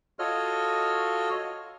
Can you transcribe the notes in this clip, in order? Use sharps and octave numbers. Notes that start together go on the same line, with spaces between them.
F4 F#4 A4 C#5 D#5 F6